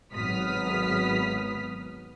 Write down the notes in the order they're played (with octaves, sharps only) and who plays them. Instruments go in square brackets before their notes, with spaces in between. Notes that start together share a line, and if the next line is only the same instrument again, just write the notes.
[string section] G#1 F#3 B3 D#6 F6 B6